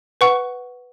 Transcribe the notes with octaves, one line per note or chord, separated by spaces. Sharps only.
B4 F#5 C#6